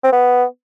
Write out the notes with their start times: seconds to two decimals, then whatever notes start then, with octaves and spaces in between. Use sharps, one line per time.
0.03 C4
0.12 B3